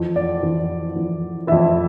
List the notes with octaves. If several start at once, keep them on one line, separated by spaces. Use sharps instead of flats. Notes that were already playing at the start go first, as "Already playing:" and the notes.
Already playing: F2 E3
D5
F2 E3
F2 E3
F2 E3 E4 E5